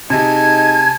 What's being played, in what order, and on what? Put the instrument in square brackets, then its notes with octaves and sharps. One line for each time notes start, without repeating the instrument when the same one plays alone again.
[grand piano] C3 [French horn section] D#4 G#4 D#5 [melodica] G#5 A5 [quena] G#6